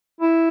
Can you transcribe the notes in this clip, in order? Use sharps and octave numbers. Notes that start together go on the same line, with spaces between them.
E4